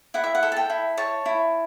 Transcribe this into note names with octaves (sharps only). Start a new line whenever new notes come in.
E4 F#5
E5
F#5
A4
A5
G5
E4
C#5 A5
E4